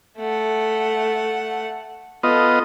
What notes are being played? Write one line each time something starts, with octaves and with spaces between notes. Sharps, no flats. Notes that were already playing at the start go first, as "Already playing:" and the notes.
A3 F#5
B3 F4 A4 D#5